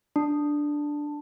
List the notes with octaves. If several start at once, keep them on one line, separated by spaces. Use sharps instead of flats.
D4